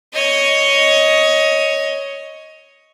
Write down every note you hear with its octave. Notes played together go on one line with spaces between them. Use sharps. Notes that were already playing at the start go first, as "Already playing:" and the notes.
C#5 D#5